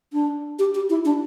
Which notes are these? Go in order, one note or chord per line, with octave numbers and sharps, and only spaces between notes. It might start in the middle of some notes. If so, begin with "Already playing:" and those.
D4
G4
G4
E4
D4